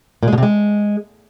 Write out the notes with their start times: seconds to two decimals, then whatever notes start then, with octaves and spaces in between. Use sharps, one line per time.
0.23 A#2
0.28 G#3
0.33 B2
0.38 C3
0.43 G#3